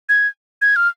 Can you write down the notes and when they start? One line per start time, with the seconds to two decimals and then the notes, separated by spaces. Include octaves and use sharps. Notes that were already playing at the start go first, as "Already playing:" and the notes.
0.09 G#6
0.62 G#6
0.76 F6